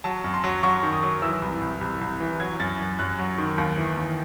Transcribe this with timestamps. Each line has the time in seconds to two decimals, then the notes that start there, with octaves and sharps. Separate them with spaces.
0.04 F#3 A5
0.24 F#2
0.34 C6
0.44 F#3
0.63 F#3 C#6
0.83 D#3
0.93 D#6
1.03 F#3
1.22 E3 E6
1.42 C2
1.61 C2
1.81 C2
2.01 C2
2.20 E3
2.40 F#3 G#6
2.60 F#2 A6
2.79 F#2
2.99 F#2 F#6
3.19 F#3
3.38 D#3
3.58 D#2
3.78 E3
3.97 D#2